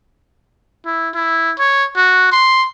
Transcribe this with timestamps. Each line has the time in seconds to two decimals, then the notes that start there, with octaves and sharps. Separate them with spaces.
0.86 E4
1.14 E4
1.59 C#5
1.96 F#4
2.32 C6